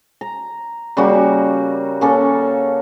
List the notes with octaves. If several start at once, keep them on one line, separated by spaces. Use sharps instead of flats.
A#5
C#3 G3 A#3 F#4
A#3 C#4 A4